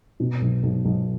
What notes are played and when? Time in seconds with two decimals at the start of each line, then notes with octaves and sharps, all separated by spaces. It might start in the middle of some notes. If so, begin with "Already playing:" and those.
0.20 B2
0.41 B1
0.63 B1
0.85 B1